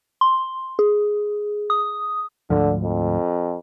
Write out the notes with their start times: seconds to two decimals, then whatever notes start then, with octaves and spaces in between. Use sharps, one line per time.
0.21 C6
0.79 G#4
1.70 D#6
2.50 D2 G#2 D3 F3
2.84 F2